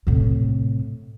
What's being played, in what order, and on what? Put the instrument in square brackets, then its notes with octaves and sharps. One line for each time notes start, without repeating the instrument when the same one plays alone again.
[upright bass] A2 C3